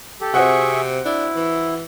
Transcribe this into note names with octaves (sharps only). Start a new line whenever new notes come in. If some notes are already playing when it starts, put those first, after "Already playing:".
G4 A4
C3 C4 F#4 G#4 E5 F#5 C#6
D4 E4
E3